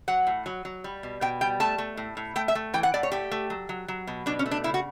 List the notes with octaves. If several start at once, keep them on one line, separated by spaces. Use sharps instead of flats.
F#3 F#5
A2
F#3
F#3
G3
B2
B2 G5
G3 G5
A3 A5
A3
A2
A2
A3 G5
E5
A3
E3 G5
F#5
A2 D5
C#5
A3 G4
A3
F#3
F#3
F#3
B2
B2 D4
C#4
A3
D4
C#3 E4
F#4